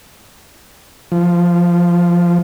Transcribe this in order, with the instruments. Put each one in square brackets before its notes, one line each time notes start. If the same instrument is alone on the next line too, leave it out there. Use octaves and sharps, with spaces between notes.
[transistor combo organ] F3